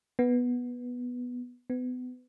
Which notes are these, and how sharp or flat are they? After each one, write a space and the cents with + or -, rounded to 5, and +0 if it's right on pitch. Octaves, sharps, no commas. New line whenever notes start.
B3 -5
B3 +30